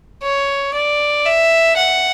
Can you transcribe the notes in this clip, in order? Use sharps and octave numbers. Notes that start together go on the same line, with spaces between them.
C#5
D5
E5
F#5